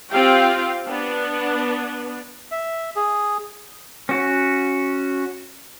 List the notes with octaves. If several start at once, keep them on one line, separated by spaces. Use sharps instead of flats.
C4 F4 G4 F5 G5
B3 D4
E5
G#4
C#4 F#4